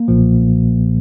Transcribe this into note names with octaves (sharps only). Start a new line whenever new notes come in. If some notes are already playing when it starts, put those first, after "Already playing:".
Already playing: A#3
B1 A#2 F3